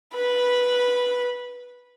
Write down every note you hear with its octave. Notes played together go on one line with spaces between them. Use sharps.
B4 B5